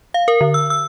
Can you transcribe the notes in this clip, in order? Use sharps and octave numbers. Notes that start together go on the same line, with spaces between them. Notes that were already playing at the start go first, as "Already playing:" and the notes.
F5
A#4
D3
E6
E6